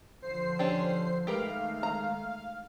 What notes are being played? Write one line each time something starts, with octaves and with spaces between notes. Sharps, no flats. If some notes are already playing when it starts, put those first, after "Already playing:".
D3 F3 C5 C7
C#4 D4 G4
D#3 G#3 A3 G4 A#4 B4 F5
A#5